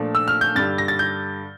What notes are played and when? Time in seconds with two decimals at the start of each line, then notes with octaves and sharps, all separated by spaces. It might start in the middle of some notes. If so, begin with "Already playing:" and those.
Already playing: A#2 F3 A3 D4
0.15 E6
0.28 F6
0.41 G6
0.55 G2 D3 G3 A6
0.78 A#6
0.88 A6
0.99 G6